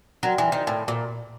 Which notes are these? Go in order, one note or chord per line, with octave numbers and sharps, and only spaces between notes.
F#3 A#4 D5 G5 C6
E3
D#3
A2
A#2